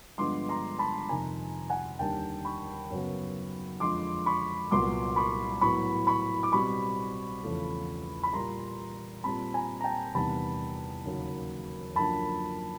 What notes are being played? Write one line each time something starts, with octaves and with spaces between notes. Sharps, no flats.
G2 D3 F3 G#3 B3 C6 D6
A#5 C6
A5 B5
F2 C3 D#3 G#5 A#5
F#5 G#5
D#2 D3 G3 G5 A5
B5 C#6
F#2 C#3 F#3 B3
F2 D3 F3 G#3 C6 D6
B5 C#6
C2 A#2 F#3 B3 C6 D6
B5 C#6
A2 F#3 B3 B5 C#6
B5 C#6
D6
B2 G3 C4 B5 C#6
E2 C#3 F3 A3
B5
A#2 G3 A#3 A#5 C6
A#2 G3 C4 A5 B5
G#5 A#5
A#5
G5 A5
E2 C3 D#3 G3 B3 A5 B5
D#2 C#3 F#3 A#3
F#2 D3 F3 A#3 A5 B5